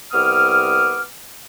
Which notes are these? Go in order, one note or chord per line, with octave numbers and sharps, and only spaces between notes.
C2 B3 D6 D#6 F6